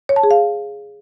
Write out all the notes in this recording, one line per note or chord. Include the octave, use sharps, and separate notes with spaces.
C#5
A5
G#4
F5